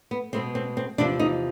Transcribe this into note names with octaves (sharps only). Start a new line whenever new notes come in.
B3
B2 G#3 B3 C4
C4
C4
E2 C3 F3 D4
D#4